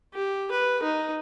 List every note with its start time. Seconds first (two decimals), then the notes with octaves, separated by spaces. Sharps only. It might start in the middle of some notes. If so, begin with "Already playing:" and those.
0.14 G4
0.51 B4
0.83 D#4